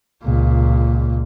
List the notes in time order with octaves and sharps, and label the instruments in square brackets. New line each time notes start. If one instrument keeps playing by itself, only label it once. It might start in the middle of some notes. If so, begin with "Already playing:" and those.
[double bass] C#2 A#2